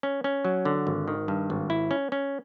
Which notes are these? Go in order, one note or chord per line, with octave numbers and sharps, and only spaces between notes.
C#4
C#4
F#3
D3
G#1
D#3
G2
G#1
E4
C#4
C#4